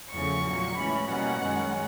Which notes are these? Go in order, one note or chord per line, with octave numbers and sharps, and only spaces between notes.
E2 C#3 F3 A3 C#6
A#2 F#3 A#3
A2 E3 G#3 C#4 B5
B2 G3 A#3 C#4 F#5
F#2 D#3 G#3 C#4